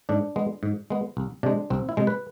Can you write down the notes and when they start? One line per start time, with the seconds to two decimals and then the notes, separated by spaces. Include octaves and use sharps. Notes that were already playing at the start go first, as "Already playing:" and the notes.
0.09 G#2 D4
0.36 G#3 B3
0.63 G#2
0.90 G#3 B3
1.17 C2
1.43 C3 G#3 D4
1.70 C2 C4
1.89 E4
1.97 C3 G#3
2.07 B4